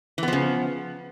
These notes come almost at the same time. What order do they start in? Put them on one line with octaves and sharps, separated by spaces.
E3 B3 F3 C#3